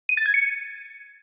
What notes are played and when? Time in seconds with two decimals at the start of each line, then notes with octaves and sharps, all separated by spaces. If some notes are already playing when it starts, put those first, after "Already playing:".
0.09 D#7
0.17 A6
0.26 G#6
0.34 C#7